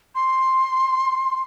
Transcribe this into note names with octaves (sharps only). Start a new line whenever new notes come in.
C6